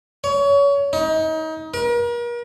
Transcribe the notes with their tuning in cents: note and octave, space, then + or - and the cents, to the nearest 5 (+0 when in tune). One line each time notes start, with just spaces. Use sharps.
C#5 +25
D#4 +30
A#4 +40